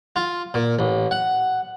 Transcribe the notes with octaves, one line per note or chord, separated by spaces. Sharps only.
F4
A#2
A1
F#5